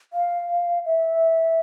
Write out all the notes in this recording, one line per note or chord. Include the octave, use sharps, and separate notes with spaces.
F5
E5